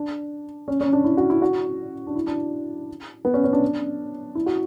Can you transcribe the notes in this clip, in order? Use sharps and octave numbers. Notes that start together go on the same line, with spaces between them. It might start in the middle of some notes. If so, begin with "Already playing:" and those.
Already playing: D4
C#4
C#4
D4
E4
F#4
E4
F#4
D4
E4
D4
B3
C#4
C#4
D4
E4
F#4